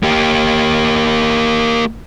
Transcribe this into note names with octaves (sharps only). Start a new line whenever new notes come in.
A#3 G4